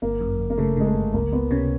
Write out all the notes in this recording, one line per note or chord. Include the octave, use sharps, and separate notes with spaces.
G1 A#3
F#2
G1
A#3
C#3 A3
C#3 G#3
A3
G1
C#2 A#3
C#2 B3
C3 C#4